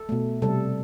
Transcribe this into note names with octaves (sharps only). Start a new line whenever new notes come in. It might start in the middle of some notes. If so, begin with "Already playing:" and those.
Already playing: A4
B2 A3
C3 G3 A4